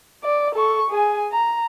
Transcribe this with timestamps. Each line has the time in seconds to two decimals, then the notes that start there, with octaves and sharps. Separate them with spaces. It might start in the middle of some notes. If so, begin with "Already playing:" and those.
0.24 D5
0.55 A4 C#6
0.90 G#4 G#5
1.32 A#5